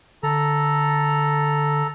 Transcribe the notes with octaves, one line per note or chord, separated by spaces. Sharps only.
D3 A4 A#5